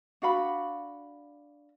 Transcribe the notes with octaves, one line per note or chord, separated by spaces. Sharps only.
D4 F#4 F5 B5